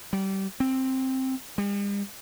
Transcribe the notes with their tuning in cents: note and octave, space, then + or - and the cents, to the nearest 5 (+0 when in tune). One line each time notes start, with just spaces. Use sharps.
G3 -25
C4 +5
G3 +45